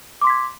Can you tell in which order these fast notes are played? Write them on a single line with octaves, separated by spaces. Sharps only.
D6 C6 B6 G#6